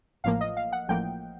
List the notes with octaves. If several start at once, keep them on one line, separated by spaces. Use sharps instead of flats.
A1 A2 F3 A#3 F5
D#5
F5
F#5
A1 A2 F3 A#3 G5